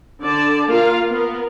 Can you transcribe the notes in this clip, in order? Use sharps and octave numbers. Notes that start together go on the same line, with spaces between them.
D3 D5 A5
A#3 F4 A#4 F5
B3 A#4